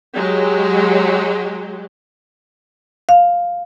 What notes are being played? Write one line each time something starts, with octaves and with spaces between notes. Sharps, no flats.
F#3 G#3 G4
F5